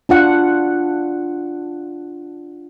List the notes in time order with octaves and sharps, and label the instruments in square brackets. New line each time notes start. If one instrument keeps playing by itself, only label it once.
[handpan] D4 F4 F#5